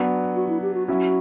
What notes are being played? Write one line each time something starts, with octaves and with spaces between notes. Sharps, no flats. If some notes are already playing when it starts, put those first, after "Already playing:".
Already playing: F#3 B3 D4
F#4
E4
G4
F#4
F#3 C#4 E4 F#4